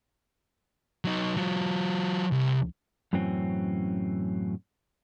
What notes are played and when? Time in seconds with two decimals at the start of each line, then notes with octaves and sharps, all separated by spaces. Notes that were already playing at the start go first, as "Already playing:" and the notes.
1.05 F#3 D#4
1.37 F#3 F4
2.32 C2
3.13 F#2 A2 E3 F#3 C4 C#4